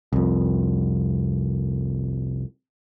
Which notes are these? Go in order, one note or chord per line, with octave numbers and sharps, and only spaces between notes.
C2 F2